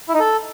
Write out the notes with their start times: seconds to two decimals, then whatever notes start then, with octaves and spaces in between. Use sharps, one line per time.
0.09 E4
0.14 D#4
0.20 A4